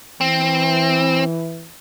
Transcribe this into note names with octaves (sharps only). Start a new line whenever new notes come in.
E3 C4